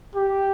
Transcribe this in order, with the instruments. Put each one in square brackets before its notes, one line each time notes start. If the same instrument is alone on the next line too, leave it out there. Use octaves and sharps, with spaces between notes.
[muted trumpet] G4